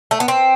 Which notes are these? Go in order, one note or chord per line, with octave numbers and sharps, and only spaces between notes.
A3
B3
C4